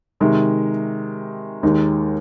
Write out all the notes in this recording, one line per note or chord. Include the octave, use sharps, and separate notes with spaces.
C3 D#3 G#3
D#2 D#3 G#3 D#4